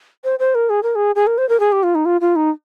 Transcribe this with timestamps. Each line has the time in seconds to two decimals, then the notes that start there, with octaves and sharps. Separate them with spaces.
0.24 C5
0.39 C5
0.55 A#4
0.70 G#4
0.83 A#4
0.95 G#4
1.16 G#4
1.27 A#4
1.38 C5
1.49 A#4
1.60 G#4
1.72 G4
1.83 F4
1.95 D#4
2.05 F4
2.21 F4
2.36 D#4